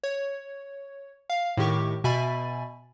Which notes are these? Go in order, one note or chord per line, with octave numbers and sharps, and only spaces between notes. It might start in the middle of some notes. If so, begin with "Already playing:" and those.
C#5
F5
A2 D#3 G4 C#6
B2 E5 G#5 B5 A6